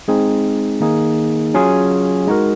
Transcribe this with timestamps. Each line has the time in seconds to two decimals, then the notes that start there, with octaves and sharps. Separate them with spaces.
0.08 G#3 C4 D#4 G#4
0.80 D#3 A#3 D#4 G#4
1.54 F#3 C#4 F4 G#4
2.27 G#3 D#4 F#4 A#4